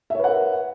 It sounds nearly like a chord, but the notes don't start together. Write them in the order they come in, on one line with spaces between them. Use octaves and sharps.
E5 C#5 B4 F#5 A#4